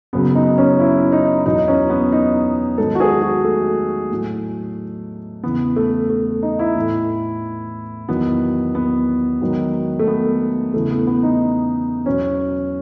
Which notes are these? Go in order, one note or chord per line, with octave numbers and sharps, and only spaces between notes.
F#2 C#3 F#3 B3
D#4
C#4
E4
D#4
E2 B2 F#3 D#4
C#4
B3
D#4
G#2 D#3 F#3 A4
F#4
G#4
F#4
A3
A2 F#3
E2 C#3 E3 B3
A3
A3
D#4
E4
A2 E3
E2 D#3 F#3 B3
B3
G#2 D#3 F#3
A3
B3
E2 C#3 E3 A3
B3
B3
D#4
E2 B2 F#3 C#4